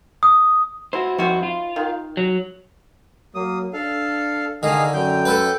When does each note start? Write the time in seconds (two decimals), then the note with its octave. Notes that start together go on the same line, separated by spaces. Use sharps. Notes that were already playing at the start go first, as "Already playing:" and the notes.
0.23 D#6
0.93 E4 F#4 C5
1.18 F2 D#3 E4 F#4 C5
1.43 F4
1.76 D#3
2.17 F#3
3.35 F#3 A#3 D#6
3.73 D4 A4 F5
4.63 D3 D#3 G#4 D#5 F5
4.94 F#2 G5 G6
5.25 A4 B4